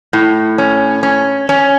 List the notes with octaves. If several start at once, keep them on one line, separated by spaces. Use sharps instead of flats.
A2
C#4
C#4
C#4